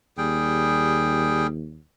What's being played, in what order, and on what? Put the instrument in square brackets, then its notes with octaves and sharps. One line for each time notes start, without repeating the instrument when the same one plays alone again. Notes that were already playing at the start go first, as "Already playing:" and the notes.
[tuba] D#2 [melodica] G3 G#4 G5